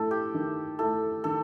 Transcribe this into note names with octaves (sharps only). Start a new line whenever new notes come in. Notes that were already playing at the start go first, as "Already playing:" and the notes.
Already playing: A3 E4 A4
G4
D#3
A3 E4 A4
D#3 A4